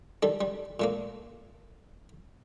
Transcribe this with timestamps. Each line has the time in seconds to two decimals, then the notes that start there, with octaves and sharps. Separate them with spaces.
0.23 D#3 G3 A4
0.41 G3
0.80 A#2 A3 A#3